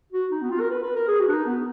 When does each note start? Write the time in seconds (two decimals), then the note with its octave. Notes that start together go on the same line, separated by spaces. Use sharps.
0.13 F#4
0.32 D#4
0.42 B3
0.51 F4
0.60 A#4
0.70 B4
0.83 B4
0.95 A#4
1.08 G#4
1.20 F#4
1.28 D4
1.33 D#4
1.46 B3